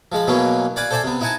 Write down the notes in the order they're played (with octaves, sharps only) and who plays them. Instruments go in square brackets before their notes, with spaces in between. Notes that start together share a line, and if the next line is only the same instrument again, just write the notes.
[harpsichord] F3 G#3 B5
B2 E3 F#3 A#3 B3 C#4
D5 F5 F#5 G#5 B5 D6
A4 C5 D5 E5 G#5 B5
C3 B3
D#4 E4 D#5 F#5 G#5 A5